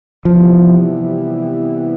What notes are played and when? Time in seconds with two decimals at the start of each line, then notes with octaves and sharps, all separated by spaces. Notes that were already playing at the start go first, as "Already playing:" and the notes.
0.25 C3 E3 F3 G3 B3 E4